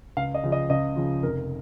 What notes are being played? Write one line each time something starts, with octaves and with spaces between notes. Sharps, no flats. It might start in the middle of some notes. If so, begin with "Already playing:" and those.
C#2 F5
D#5
C#3 F3
D#5
C#2 D#5
C#3 F3
F1 A#4